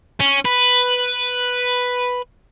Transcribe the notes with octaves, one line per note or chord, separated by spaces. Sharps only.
C#4
B4